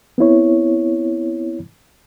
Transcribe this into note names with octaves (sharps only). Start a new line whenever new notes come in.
B3 C4 E4 C#5